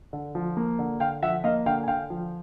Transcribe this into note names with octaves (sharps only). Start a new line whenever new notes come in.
D3
F3
A#3
D3
D3 F5 G5
F3 E5 F#5
A#3 D#5 F5
D3 F5 G5
G#5
D3 F5 G5
F3